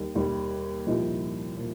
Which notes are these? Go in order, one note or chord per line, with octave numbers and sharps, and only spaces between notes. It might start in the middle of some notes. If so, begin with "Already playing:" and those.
Already playing: D#2 D#3 G3
D#2 D#3 G3
C2 A#2 F3 D#4 G4
A#2 F3